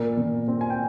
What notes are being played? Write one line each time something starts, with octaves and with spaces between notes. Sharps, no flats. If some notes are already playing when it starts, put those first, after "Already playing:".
Already playing: A#2 A#4 D5
A#2
C4
G#5
G5